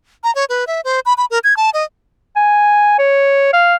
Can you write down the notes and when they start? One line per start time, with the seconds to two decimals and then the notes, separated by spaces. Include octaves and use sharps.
0.24 A#5
0.35 C#5
0.49 B4
0.67 E5
0.84 C5
1.06 B5
1.18 B5
1.31 A#4
1.44 G#6
1.57 A5
1.74 D#5
2.36 G#5
2.99 C#5
3.53 F5